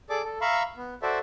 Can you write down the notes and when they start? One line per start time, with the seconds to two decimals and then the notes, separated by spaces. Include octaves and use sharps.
0.10 G#4 A4 D5 D6
0.24 A4
0.41 E5 F5 A#5 B5 C#6 E6
0.77 B3
1.02 F#4 A4 C5 D5 E5